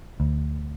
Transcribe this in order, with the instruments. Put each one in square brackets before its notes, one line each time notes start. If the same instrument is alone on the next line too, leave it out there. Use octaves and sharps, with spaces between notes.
[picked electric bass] D2